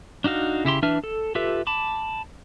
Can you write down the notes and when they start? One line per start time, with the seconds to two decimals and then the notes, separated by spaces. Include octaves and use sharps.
0.24 D4 D#4 F#4 F5
0.65 C#3 E4 G4 C6
0.82 E3 D4 B4 E5 F6
1.04 A4
1.35 F4 G4 A4 B4 E5
1.67 A5 B5 D6